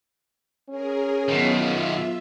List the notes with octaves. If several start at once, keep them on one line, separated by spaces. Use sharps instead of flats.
C#4 G#4 A#4
B2 D#3 F#3 B3 F4
F4 E5